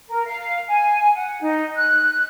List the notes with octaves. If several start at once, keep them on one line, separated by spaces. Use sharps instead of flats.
A#4
F5
G#5
F#5
D#4
F#6